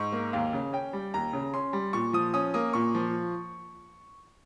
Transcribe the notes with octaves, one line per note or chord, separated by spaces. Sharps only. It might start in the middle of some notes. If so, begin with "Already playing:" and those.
Already playing: G#2 C#6
A#3
D#2 F5
C#3
C#4 G5
G3
D#2 A#5
C#3
C#4 C6
G3
A#2 C#6
F3 D#6
C#4 D#6
A#3 D#6
A#2 C#6
F3